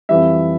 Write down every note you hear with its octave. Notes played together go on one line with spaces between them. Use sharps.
F2 E3 G3 E5